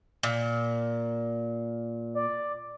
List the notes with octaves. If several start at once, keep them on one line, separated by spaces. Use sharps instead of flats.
A#2
D5